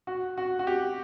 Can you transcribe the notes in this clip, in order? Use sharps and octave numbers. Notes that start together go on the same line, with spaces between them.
F#4
F#4
F#4
G4